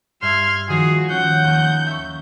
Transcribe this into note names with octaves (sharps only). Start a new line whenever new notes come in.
G2 E5 C6 F6 G#6
D#3 F3 F#4 G#4
C#4 F#5 G6
D#2 A#3
E5 C#6